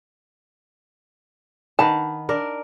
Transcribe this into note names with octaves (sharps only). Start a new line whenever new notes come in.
D#3 B4 F#5 A5
D4 A#4